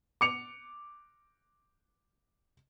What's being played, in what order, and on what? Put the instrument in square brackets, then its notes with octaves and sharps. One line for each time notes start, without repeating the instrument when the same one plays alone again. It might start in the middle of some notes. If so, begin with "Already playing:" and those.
[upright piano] D6 C#7 F7